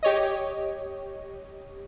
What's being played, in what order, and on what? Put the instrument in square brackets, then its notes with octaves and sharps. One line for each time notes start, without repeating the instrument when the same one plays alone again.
[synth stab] G4 C#5 D#5